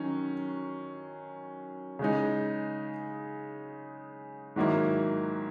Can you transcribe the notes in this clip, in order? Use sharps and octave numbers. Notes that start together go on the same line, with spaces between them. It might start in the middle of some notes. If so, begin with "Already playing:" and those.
Already playing: D#3 F#3 C#4
C#3 G#3 D#4
G#2 D#3 F#3 A#3 E4